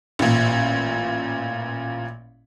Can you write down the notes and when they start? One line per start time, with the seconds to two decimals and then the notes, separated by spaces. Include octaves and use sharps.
0.19 A1 A#2